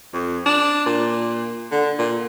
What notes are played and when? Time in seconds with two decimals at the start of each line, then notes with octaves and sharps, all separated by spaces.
0.13 F2
0.46 D4
0.86 A#2
1.71 D3
1.98 A#2